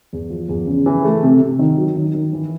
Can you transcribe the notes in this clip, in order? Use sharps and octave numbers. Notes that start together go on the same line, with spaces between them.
E2
F3
E2
C#3
E3
A3
C3
C3
D#3
F#3
D#3
D#3
E3